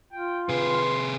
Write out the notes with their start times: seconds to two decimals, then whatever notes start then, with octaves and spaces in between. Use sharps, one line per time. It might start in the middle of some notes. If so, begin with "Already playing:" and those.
0.13 F4 G5
0.49 C3 G#4 B4 C6